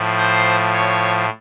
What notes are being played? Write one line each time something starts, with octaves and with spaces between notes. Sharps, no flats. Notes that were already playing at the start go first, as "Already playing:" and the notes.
Already playing: A2 F3
C5
C#5